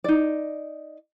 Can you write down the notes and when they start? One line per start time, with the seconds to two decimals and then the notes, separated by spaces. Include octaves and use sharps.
0.04 D#4 D5